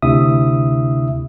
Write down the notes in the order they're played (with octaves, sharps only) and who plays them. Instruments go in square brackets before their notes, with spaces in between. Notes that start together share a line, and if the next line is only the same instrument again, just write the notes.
[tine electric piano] D2 C3 D4 E4 E5 D#6